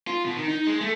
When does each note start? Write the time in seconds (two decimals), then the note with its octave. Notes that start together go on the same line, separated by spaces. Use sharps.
0.07 F4
0.25 B2
0.37 D#3
0.48 D#4
0.67 G#3
0.81 A3